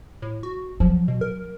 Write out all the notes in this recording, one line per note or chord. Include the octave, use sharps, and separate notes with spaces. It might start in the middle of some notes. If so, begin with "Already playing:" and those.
A2
F#4
F3 F#3
B2
A#4